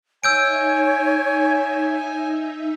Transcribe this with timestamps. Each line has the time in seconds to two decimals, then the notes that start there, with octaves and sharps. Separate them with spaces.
0.24 D#4 C#5 E5 G#5 E6 G6 D7